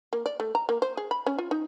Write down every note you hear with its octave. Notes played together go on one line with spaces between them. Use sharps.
A#3
D5
A3
A#5
A#3
C5
G#4
B5
C#4
F4
D#4